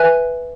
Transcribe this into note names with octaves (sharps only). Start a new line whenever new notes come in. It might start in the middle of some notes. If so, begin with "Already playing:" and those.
Already playing: B4 E5 G#5 F#6